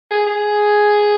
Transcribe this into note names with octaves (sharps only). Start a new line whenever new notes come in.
G#4
G#4